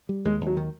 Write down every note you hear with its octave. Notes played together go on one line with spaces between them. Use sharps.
G3
D#2 G#3
D#2
F#3
D#3